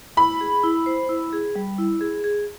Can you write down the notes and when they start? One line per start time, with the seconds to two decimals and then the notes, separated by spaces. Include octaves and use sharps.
0.17 E4 B5
0.41 G#4
0.64 E4
0.86 C5
1.09 E4
1.33 G#4
1.56 G3
1.78 E4
2.01 G#4
2.24 G#4